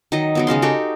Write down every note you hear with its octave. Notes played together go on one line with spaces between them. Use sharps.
D#3 F#3 D#5
D#3 F#3 B3
C#3 G#3 F5 C6
D#4 F#4 G4 A4